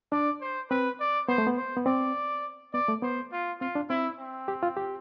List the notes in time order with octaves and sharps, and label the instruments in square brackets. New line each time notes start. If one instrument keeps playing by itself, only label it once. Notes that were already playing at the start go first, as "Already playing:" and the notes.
[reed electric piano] D4 [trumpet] D5
[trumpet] C5
[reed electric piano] C4 [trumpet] B4
[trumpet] D5
[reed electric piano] B3 [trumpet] C5
[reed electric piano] A3
B3
[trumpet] C5
[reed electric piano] B3
[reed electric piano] C4 [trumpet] D5
[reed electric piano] B3 [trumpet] D5
[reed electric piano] A3
[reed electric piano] B3 [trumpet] C5
[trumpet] F4
[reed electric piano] C4 [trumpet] F4
[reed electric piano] D4
[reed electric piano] C4 [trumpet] E4
[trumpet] C4
[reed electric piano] G4
F4
G4